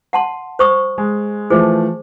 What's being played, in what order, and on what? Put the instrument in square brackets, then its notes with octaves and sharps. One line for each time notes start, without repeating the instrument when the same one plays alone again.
[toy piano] F#5 A5 C6
C5 C#6 D#6
[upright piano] G#3
[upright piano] E3 F3 A3 [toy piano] G#4 C5